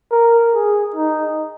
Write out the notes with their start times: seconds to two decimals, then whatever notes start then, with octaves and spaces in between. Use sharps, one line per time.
0.11 A#4
0.54 G#4
0.96 D#4